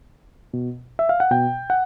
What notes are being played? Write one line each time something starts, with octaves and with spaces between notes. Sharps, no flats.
B2
E5
F5
F#5
B2 G5
F#5